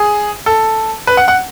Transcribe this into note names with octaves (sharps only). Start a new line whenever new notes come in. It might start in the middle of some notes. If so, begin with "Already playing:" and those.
Already playing: G#4
A4
B4
F#5
F#5